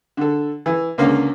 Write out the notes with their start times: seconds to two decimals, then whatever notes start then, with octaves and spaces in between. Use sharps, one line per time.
0.17 D3 A4
0.66 E3
0.98 C#2 D3 A#3 C#4 F5